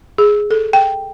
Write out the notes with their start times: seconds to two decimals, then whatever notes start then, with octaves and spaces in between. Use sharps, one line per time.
0.18 G#4
0.51 A4
0.73 G5